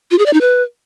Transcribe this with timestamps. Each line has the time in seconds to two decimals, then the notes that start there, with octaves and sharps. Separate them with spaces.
0.11 F4
0.18 G#4
0.26 D5
0.33 D#4
0.41 B4